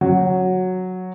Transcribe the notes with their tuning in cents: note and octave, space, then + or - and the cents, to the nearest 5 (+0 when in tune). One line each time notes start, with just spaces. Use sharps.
F#3 -5